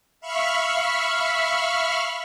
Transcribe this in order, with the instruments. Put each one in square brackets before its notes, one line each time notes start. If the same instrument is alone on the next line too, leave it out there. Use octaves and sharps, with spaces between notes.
[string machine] E5 F5 B5 C#6 F6